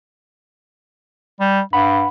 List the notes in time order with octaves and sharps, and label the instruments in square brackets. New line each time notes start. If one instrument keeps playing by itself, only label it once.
[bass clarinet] G3
[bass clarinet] G2 [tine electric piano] F#5 B5